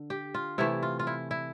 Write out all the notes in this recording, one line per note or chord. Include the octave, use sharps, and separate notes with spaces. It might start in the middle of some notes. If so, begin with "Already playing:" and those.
Already playing: D3
G4
F4
C3 E3 A3 E4
F4
F4
E4
E4